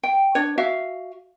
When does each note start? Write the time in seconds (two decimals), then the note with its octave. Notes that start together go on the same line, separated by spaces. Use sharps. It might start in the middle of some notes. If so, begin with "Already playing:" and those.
0.03 G5
0.35 D4 C#5
0.58 F#4 E5 F5